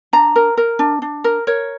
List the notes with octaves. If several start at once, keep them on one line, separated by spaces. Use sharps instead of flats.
D4 A#5
A#4
A#4
D4
D4
A#4
A#4 C#5